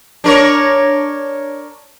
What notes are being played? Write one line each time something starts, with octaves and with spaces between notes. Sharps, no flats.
D4 A#4 C#5